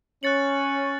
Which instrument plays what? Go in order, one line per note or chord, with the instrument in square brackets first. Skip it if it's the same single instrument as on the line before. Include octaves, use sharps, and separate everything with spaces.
[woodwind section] C#4 [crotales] F#6 A6 C#7 F#7